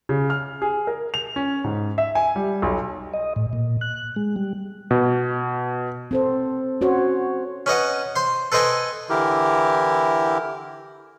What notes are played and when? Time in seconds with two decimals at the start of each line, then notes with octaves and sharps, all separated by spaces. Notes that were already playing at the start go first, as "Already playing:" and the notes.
0.09 C#3
0.30 F6
0.62 G#4
0.87 A#4
1.14 F7
1.36 C#4
1.64 G#2
1.98 E5
2.15 G#5
2.36 G3
2.62 B1
3.13 D#5
3.36 A2
3.53 A#2
3.81 F#6
4.16 G#3
4.36 G3
4.91 B2
6.11 C4 A4 C5
6.81 C#4 F#4 C5 C#5
7.66 C#4 B4 D#5 F#5
8.16 C5 C6
8.52 A4 B4 C5 D#5 G5 G#5
9.10 D3 E3 E4 G4 A#4